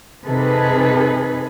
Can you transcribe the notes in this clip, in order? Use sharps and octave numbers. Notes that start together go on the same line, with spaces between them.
C3 D#4 G#4 A4 B4